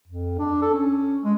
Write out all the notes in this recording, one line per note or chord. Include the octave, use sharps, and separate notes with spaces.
F2
D4
A4
C#4
G#3